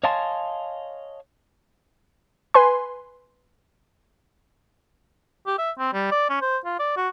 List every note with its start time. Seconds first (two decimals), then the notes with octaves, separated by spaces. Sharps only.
0.04 C#5 D#5 F5 G#5 A5 C6
2.54 B4 G#5 C6
5.47 G4
5.59 E5
5.79 C4
5.93 G3
6.12 D5
6.29 C#4
6.42 C5
6.65 F4
6.79 D5
6.97 F#4